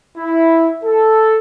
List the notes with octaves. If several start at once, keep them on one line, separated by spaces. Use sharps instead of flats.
E4
A4